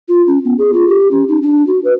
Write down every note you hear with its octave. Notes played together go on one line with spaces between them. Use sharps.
F4
C#4
B3
G#4
F4
G4
C#4
D#4
D4
F#4
B4